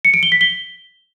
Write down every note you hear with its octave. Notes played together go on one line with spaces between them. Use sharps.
C#7
D7
G7
B6
G7